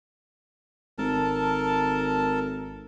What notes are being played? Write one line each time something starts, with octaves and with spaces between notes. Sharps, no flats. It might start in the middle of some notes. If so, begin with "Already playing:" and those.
G#1 A4 A#4 A5